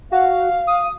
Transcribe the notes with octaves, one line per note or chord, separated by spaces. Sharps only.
F#4 F5
D#6